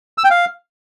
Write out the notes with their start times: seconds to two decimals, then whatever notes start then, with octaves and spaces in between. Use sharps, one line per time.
0.18 E6
0.24 G5
0.30 F5